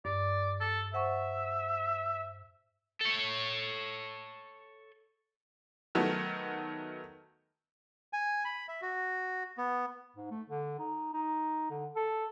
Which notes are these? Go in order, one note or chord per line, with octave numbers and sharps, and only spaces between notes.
G2 D5
A4
C5 E5 F#5 C#6
A4 C#5
D#3 F#3 A3 B3
G#5
B5
E5
F#4
B3
G#2
A3
D3
D#4
D#4
D3
A4